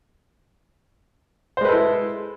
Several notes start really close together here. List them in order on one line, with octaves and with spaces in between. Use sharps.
C5 G#3 B4 A4 E4